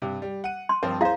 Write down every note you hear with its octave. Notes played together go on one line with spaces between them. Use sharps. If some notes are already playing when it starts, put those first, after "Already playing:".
G2 C3
G3
F#5 D#7
C6
G2 F3 C4 A#4
E4 G#4 C5 F5